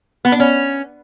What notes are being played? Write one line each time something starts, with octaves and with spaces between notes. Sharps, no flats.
B3
D4
C#4